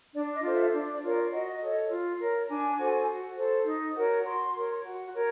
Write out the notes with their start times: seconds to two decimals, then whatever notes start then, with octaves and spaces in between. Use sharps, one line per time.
0.14 D4 D5
0.34 D#5
0.43 F4 A4 C5
0.54 E5
0.73 D4 D5
0.92 D5
1.02 F4 A#4 C#5
1.13 D5
1.31 F#4 D#5
1.61 A4 C#5
1.90 F4
2.19 A#4 C#5
2.48 D4 G#5
2.78 F#4 A4 C5
3.07 F#4
3.36 A4 C5
3.66 D#4
3.96 F#4 A#4 C#5
4.24 F#4 C6
4.55 A#4 C#5
4.83 F#4
5.13 A#4 C#5